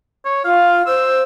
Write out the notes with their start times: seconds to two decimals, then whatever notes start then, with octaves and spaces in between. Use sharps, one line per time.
0.25 C#5
0.45 F4 F5
0.86 C5 E6